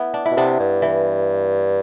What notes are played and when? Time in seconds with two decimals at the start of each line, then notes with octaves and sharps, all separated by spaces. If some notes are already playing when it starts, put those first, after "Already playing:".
Already playing: B3 E4
0.14 D4
0.26 E4
0.31 B2
0.37 C3 B3 D4
0.60 G2
0.82 E3